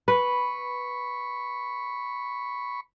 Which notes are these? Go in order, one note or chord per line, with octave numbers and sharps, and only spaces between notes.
B4 B5 C#6